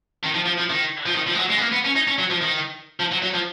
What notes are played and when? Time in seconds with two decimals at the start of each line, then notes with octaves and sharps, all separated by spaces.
0.24 D#3
0.35 F3
0.46 F3
0.58 F3
0.70 D#3
1.06 F3
1.15 D#3
1.27 F3
1.34 G#3
1.39 F#3
1.50 G#3
1.57 B3
1.62 A#3
1.73 B3
1.85 C#4
1.96 D#4
2.08 C#4
2.19 F#3
2.30 F3
2.42 D#3
3.00 F3
3.11 F#3
3.22 F#3
3.34 F3